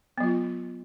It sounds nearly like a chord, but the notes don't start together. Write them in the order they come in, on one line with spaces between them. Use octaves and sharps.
B3 F#3 F4